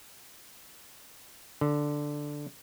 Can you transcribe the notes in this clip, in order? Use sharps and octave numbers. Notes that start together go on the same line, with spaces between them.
D3